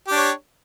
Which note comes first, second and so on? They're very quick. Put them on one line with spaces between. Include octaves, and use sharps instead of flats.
G4 D4 C#5